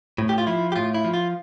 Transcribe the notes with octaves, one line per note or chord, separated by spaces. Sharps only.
A2
G4
F4
F3 E4
G4
A2 F4
E4
F3
F4